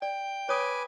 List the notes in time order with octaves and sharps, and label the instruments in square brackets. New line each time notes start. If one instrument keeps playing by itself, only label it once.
[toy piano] D5 [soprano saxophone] G5
[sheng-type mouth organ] B4 G#5 D6 [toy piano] C#5 D#6